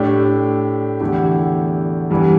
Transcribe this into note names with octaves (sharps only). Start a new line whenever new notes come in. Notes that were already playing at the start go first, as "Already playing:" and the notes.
Already playing: A2 A3 D4 G4
E2 D3 A3 E4 G4
G2 E3 G3 B3